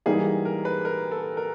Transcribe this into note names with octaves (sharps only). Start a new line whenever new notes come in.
G#2 E3 G3 A#3 D#4 G#4
A#4
B4
A#4
A4
A#4